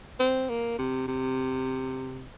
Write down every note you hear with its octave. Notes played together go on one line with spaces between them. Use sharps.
C4
A#3
C3
C3